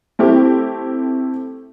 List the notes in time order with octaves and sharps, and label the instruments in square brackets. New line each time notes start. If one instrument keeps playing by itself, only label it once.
[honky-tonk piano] A3 C4 E4 G4